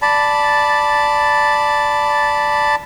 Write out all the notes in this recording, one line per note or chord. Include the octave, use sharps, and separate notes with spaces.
D5 A5 B5